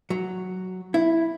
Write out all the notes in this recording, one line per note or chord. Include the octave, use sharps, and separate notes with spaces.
F#3
E4